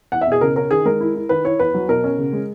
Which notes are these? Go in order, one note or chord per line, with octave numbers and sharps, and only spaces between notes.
E2 F#5
E5
B2 G#4
C#3 A#4
C#4 A#4
D#3 G#4
G#3 A#4
E4
E4
D#3 B4
E4 C#5
E2 B4
F#3
B2 A#4
C#4
C#3
G#3